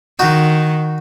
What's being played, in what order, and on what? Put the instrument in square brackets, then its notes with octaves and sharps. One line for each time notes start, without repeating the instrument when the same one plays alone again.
[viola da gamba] D#3 [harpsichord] D#4 F#4